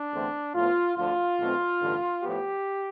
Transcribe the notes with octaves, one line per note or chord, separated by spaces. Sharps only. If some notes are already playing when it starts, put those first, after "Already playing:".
Already playing: D4
E2 D3 A3 C4
A2 F3 B3 F4
D2 D3 F3 F4
B1 B2 A3 C4
A1 G2 D3
A2 F3 B3 G4